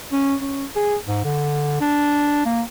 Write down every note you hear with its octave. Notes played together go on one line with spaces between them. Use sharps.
C#4
C#4
G#4
G#2
D3
D4
A#3